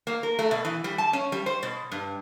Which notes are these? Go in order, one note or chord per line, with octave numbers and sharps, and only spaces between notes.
A#3
A#4
A3
B2
E3
G3
A5
C#4
G3
C5
B2
G2